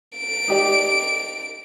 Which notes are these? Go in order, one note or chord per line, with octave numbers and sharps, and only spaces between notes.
D7
D#4 G4 D5